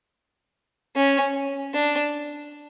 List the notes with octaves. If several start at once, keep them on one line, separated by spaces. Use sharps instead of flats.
C#4
D4